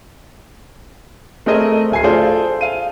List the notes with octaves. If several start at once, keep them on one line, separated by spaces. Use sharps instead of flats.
A3 C4 G#4 A#4 D#5
D1 G#5 C7
F4 G#4 A4 C5 D5
F5 D#7